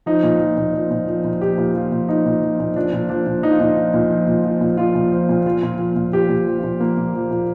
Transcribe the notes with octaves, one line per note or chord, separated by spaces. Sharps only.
F3 D#4
A#2
F3
A#2
F3
A#2
F3
A#2
F3 G4
A#2
F3 F4
A#2
F3 D#4
A#2
F3
A#2
F3 D4
A#2
F3 D4
A#2
F3 D#4
F4
A#2 D#4
F3
A#2
F3
A#2
F3
A#2
F3 F4
A#2
F3
A#2
F3 F4
A#2
F3
A#2
F3 G4
A#2
F3
F4
A#2
F3 A#3
A#2
F3
A#2